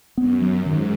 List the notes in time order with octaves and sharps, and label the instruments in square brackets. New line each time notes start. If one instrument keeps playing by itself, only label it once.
[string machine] F#2 [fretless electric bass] B3
[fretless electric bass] F#3
[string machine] G#2 [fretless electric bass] D#3